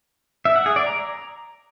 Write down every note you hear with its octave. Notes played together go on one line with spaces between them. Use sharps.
E5
F#5
G#4
D5
A#5